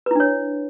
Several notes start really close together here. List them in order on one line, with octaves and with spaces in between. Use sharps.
B4 E4 D4 C#5